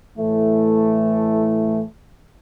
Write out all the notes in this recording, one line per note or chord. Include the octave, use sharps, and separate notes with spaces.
A2 E3 A3